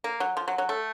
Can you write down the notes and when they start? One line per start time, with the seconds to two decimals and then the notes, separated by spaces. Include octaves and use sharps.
0.04 A#3
0.20 F#3
0.37 F3
0.48 F#3
0.58 F#3
0.69 A3